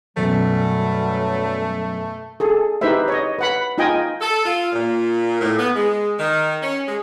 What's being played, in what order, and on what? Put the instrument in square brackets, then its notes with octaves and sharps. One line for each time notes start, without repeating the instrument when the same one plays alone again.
[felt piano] F#2 B2 [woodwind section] F#3 G3 [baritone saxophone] A3
[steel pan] G#4 A4
D#4 E4 G4 B4 C5 E5
C#5 D#5
B4 F#5 B5
D#4 F4 D#5 G5 G#5
[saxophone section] A4
F4
A#2
A2
B3
G#3
D#3
C#4
G#3